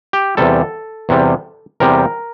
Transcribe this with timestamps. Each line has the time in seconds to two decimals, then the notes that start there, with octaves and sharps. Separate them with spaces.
0.13 G4
0.37 E2 C3 G3 A4
1.09 E2 C3 G3
1.80 E2 C3 G3 A#4